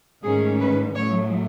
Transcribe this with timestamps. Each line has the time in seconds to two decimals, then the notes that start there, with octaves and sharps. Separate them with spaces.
0.23 G#2 D#3 A3 C#4 G#4
0.60 B4
0.95 A2 F#3 A3 C#5